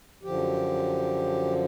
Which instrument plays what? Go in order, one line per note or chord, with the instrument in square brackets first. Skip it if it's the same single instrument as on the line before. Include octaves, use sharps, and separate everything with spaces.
[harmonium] F#2 D3 F3 G4